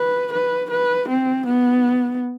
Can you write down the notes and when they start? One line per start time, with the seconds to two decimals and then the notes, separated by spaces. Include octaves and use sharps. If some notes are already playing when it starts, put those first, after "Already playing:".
Already playing: B4
0.33 B4
0.71 B4
1.09 C4
1.46 B3